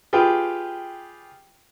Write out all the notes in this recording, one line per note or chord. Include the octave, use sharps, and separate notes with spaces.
F4 G4 G#4 B4 G5